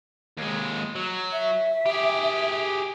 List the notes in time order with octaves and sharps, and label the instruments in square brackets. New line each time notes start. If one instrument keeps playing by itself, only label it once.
[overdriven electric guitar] D#2 G#3
F#3
[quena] E5
[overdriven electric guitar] G4 G#4